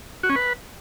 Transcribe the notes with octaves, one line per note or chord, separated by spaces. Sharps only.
F#4
C#4
B4